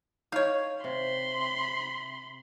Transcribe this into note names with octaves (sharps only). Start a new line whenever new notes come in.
D#4 C#5 F5
C3 B5 C6